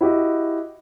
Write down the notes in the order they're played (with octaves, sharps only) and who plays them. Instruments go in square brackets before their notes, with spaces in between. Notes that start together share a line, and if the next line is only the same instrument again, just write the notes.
[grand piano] E4 F#4 G4 D#5